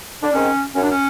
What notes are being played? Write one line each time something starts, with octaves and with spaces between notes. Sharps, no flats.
D4
D#3 G#3 C4 C#4
F#2 C#4
D4
C#4